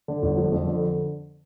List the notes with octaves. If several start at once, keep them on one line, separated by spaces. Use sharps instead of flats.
D3
G1
F3
F2
D3